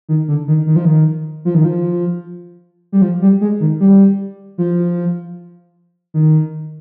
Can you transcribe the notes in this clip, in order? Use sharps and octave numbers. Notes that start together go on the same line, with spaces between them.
D#3
D3
D#3
D#3
F3
D#3
F3
D#3
F3
G3
F3
G3
G#3
D#3
G3
F3
D#3